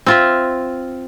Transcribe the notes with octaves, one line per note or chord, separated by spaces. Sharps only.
C4 F4 E5